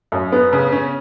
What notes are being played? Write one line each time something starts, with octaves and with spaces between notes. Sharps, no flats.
F#2
B3
C#3
C#4